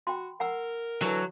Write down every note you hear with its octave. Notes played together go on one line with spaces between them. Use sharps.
F#4 G5 B5 C6
A#4 F#5 A#5 E6
D3 E3 F#3